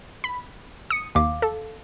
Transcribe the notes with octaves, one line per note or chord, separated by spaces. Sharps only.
B5
D#6 C#7
D#2 F5 D6
A4